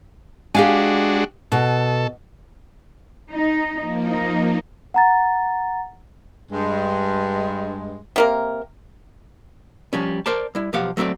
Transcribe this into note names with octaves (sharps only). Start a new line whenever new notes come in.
G#3 D4 F#4 G4 F5 G#5
B2 A4
D#4
F3 A#3
D#4
F#5 A#5 A6
G2 G#3
C3 A#3 A#4
F3 G3 C#4
A#4 C5 D5 A5
G3 E4
B1 F3 G4 F5 F#5
F#3 A3 C4 A#4 D5